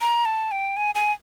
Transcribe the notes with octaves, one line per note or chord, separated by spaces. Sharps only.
A#5
A5
G5
G#5
G#5